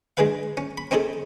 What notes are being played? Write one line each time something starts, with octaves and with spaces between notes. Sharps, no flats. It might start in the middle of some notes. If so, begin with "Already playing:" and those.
G#3 D4 G#4 B4 F5
C#4
B5
C4 C#4 D#4 G#4 A4